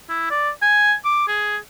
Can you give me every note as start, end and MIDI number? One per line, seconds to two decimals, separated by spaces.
0.09 0.28 64
0.30 0.50 74
0.62 0.94 80
1.05 1.27 86
1.28 1.57 68